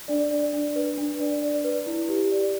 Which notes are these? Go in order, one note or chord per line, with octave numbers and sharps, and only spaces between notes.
D4 D5
D5
D4
B4
D4
D5
D5
B4
E4
G4
D5